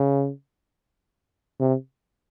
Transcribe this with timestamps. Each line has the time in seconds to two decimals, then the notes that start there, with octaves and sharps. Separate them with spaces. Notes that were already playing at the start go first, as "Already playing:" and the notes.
Already playing: C#3
1.60 C3